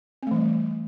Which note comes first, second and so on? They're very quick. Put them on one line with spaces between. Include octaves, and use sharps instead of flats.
C4 A3 E3 G3